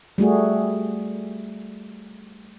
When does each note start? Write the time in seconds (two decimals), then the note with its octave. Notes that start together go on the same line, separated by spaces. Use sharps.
0.18 G3 A3 F#4 G#4